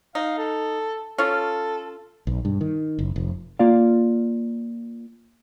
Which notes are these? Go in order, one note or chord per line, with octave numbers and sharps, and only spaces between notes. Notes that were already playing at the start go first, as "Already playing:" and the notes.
D#4 F5
A4
C#4 F4 A4
B1
G2
D#3
F#1
F1
A#3 F4 D5 F5